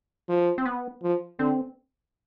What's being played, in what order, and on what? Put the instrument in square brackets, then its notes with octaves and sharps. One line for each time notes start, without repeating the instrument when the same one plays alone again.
[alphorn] F3
[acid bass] C4
B3
[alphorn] F3
[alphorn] D3 [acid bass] C4